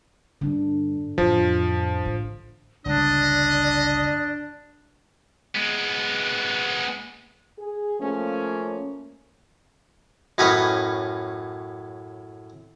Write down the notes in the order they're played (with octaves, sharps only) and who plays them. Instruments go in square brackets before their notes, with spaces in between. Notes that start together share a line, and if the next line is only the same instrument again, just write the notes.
[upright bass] G2 [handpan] D3 D4
[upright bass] A1 F2 [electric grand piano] F3
[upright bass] A1
[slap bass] G1 C#2 D3 [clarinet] D4 [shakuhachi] D5 [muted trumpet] D#5
[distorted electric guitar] G#3 B3
[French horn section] G#4
F3 A3 A#3 C#4
[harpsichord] F#2 A2 C#4 B4 D#5